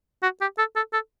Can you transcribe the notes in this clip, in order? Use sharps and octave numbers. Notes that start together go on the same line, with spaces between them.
F#4
G4
A4
A4
A4